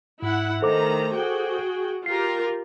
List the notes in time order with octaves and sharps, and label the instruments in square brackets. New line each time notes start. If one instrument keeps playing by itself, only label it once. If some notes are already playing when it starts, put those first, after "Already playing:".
[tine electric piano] G#2 [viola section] E4 F#5
[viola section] D#3 A3 A#5 [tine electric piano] A4 C5 D6
[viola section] F#4 G#4 G5
[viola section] F4 G4 A#4 [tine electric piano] C7